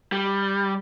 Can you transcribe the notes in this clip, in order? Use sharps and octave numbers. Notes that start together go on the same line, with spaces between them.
G3